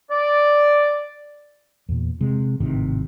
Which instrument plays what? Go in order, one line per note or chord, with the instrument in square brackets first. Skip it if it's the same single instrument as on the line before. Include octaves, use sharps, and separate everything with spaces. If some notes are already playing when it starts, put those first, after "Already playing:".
[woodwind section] D5
[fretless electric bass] E2 A#2
C3 G#3
G#1 A2 C3 D#3